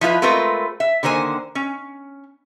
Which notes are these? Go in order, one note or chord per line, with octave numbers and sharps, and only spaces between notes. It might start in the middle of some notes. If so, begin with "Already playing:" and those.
F3 E4 F4 B4
G#3 A3 C4 F4 A#4 B4
E5
D3 D#3 A#3 C5 G#5
C#4